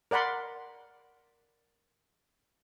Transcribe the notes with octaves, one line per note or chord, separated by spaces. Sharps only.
A#4 D5 F#5 B5 C6